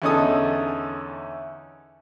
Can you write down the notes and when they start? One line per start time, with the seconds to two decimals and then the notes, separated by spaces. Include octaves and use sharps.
0.02 E2 D3 C#4 D#4 A4 D#6